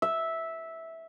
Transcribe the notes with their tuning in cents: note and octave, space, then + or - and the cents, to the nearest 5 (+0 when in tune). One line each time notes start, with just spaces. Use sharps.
E5 -10